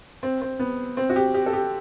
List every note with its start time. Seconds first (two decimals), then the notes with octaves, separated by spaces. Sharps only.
0.23 C4
0.41 C4
0.59 B3
0.97 C4
1.09 F#4
1.16 G4
1.34 G4
1.46 A4
1.53 G4